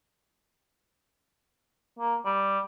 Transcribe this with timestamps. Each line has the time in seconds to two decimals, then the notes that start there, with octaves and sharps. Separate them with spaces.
1.99 A#3
2.25 G3